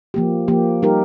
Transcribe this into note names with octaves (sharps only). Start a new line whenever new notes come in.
F3 A#3 G4
F3 A#3 G4
G3 D#4 G4 A#4